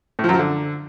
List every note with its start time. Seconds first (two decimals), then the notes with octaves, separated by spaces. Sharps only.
0.19 A2
0.24 F3
0.29 F#2
0.34 F3
0.39 D3